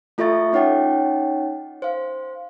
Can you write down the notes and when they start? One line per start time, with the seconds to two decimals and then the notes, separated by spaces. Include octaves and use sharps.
0.18 A3 F4 A4 E5 C#6 A6
0.53 C#4 D#4 C#5 F#5 G5
1.82 C5 F5